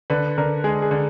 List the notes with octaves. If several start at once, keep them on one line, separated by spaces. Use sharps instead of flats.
D3 B4
D3 A#4
G#3 G#4
G#4
D3